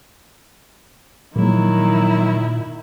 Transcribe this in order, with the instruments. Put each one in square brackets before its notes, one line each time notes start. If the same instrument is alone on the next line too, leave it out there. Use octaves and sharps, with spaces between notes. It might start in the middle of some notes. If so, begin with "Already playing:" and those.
[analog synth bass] A#2 [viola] D#3 E4 [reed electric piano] F3 G#3 A#3 [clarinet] F#3